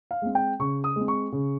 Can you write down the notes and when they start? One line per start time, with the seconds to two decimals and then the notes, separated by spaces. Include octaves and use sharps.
0.11 F5
0.22 G#3 C4
0.35 G5
0.60 C#3 C#6
0.84 D#6
0.96 G#3 C4
1.08 C#6
1.32 C#3